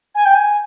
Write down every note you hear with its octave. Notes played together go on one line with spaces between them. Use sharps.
G#5
G5
G#5